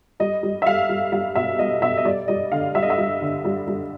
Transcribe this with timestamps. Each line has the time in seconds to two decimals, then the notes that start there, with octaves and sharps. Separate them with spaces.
0.20 G3 D#5
0.43 G3
0.62 E5
0.66 G3 F5
0.89 G3
1.12 G3 F5
1.35 B2 E5
1.59 G3 D#5
1.82 B2 E5
1.97 D#5
2.05 G3 D5
2.28 G3 D#5
2.52 D3 F5
2.75 G3 E5
2.83 D#5
2.90 E5
2.98 G3
3.21 D3
3.45 G3
3.67 G3